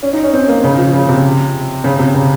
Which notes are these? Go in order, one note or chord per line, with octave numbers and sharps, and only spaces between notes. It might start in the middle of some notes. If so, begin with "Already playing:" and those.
C#4
D#4
C#4
C4
A#3
C#3
F3
C#3
C3
C#3
C3
C#3